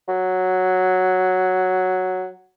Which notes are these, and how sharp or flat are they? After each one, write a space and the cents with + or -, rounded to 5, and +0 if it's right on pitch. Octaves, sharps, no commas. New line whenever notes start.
F#3 +0